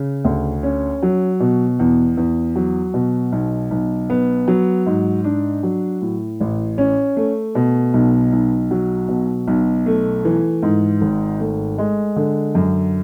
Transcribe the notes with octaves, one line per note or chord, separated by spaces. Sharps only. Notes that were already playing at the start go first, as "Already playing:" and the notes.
Already playing: C#3
D2
C#4
F#3
B2
E2
E2
F#3
B2
B1
B1
B3
F#3
G#2
D4
F#3
A2
A1
C#4
A3
B2
B1
B1
F#3
B2
B1
A3
E3
G#2
G#1
A3
G#3
D3
F#2